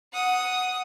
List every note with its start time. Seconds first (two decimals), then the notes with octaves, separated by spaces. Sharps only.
0.13 F#5 D#6